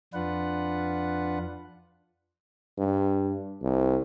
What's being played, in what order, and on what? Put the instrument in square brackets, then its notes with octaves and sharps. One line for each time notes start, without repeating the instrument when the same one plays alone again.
[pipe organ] F2 D4 F4 B4 F#5
[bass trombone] G2
C2